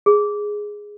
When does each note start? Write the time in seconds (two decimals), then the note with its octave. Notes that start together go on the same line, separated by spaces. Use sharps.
0.06 G#4